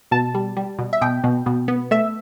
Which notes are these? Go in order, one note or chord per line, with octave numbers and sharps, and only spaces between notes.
B2 A5
G3
G3
B2
E5
B2 G5
B2
B2
B3
A3 E5